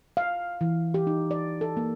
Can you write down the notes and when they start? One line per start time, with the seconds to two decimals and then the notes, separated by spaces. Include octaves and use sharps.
0.17 F5
0.61 E3
0.94 G4
1.07 D#4
1.31 D5
1.61 A4
1.77 A#3